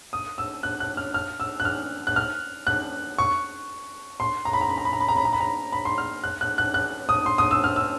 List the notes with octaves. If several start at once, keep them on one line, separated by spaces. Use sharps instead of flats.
D#6
E6
F#6
F#6
F6
F6
E6
F#6
F6
F#6
F6
F#6
C#6
C6
A#5
B5
A#5
B5
A#5
B5
A#5
B5
A#5
B5
A#5
B5
A#5
B5
C6
F6
F#6
F#6
F#6
F#6
D#6
C6
D#6
E6
F6
E6